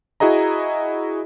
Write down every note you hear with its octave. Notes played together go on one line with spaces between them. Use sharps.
E4 F#4 G#4 D#5 A#5